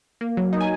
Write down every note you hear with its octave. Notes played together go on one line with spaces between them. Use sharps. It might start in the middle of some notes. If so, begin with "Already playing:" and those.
A#3
F#3
D#4
G#5